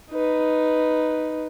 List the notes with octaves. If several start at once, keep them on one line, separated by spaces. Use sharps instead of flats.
D#4 B4